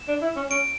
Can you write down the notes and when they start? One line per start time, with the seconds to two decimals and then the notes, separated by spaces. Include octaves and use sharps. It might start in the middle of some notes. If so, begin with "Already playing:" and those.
Already playing: E7
0.08 D4
0.22 E4
0.36 C#4
0.50 C#4 D7